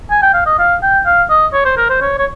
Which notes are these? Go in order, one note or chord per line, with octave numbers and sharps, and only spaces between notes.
G#5
G5
F5
D#5
F5
G5
F5
D#5
C#5
C5
A#4
C5
C#5
C#5